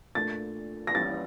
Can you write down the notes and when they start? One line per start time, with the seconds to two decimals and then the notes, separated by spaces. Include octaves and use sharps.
0.15 A#2 A3 D4 A6
0.87 A#6
0.95 E3 G3 C#4 A6